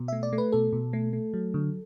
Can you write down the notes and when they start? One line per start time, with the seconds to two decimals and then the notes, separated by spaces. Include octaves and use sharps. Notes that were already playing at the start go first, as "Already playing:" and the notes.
Already playing: B2
0.08 A3 E5
0.23 D5
0.33 A3
0.38 B4
0.52 B2 A4
0.73 B2
0.93 A3
1.13 A3
1.34 F#3
1.54 D3